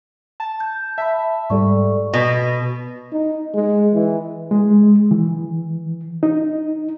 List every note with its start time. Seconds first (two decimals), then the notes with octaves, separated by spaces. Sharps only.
0.40 A5
0.60 G6
0.98 E5 A5 B5
1.50 G#2 G3 A4 D5 C#6
2.14 B2
3.12 D#4
3.54 G#3
3.94 E3
4.51 G#3
5.11 E3
6.23 D#4